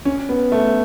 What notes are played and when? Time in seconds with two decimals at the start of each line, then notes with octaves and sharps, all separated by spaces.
0.05 C#4
0.29 B3
0.52 A3